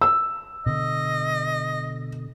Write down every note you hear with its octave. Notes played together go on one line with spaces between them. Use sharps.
E6
B2 D3 D#5